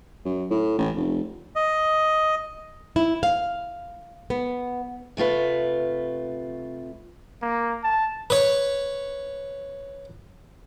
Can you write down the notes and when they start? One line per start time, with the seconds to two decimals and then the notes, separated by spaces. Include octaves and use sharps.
0.25 F#2
0.50 A2
0.78 A1
0.96 F1
1.56 D#5
2.96 E4
3.23 F5
4.30 B3
5.17 C3 A3 F4 B4
7.42 A#3
7.84 A5
8.30 B4 C#5